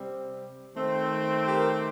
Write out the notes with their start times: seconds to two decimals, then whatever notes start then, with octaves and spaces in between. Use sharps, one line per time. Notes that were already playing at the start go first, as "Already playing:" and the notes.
Already playing: C3 G3 C4
0.73 D#3 A3 C4
1.46 G4 A#4